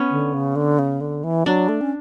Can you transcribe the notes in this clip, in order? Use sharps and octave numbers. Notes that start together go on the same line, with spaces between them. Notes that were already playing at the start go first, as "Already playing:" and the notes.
Already playing: B3 C#4
D3
C#3
D3
C#3
D3
E3
F#3 D4
A3
C#4